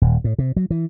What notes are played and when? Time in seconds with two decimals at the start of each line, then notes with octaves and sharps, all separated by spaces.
0.02 D#1
0.24 A2
0.39 C3
0.56 F#3
0.71 E3